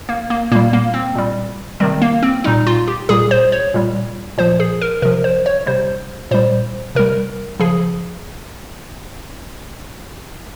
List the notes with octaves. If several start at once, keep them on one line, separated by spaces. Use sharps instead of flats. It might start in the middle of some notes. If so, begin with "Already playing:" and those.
A#3
A#3
A#2 G3 A#3
A#3
C4
A#2 G3
C3 D#3 G3 C4
A#3
C4
A#2 G3 D#4
F4
G4
A#2 G3 G#4
C5
C#5
A#2 G3
A#2 F3 C5
G#4
A#4
C3 F3 A#4
C5
C#5
C3 G3 C5
A#2 G3 C5
C3 G3 A#4
C#3 F3 G#4